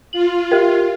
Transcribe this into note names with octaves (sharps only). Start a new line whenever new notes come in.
F4 F#7
G4 A#4